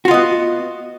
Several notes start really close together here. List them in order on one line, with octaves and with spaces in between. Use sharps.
F#4 F4 D#5 B3